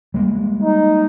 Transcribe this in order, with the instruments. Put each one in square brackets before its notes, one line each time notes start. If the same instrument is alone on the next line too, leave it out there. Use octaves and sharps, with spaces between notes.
[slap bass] G3 G#3 A#3
[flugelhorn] D#4